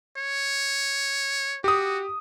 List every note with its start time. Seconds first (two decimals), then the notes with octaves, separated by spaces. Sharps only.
0.17 C#5
1.64 F#4 G4 D#6